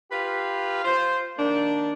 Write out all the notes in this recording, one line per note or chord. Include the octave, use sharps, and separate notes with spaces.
F4 G4 B4 F5
F4 C5
D#3 A#3 D4